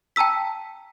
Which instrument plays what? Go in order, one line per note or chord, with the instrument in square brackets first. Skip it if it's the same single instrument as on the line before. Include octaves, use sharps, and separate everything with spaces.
[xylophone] G5 A5 A#5 E6 B6